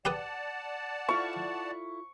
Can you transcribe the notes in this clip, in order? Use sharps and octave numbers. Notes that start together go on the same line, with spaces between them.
G4 B4 D5 F#5 A5 D#6
E4 F4 A4 C#6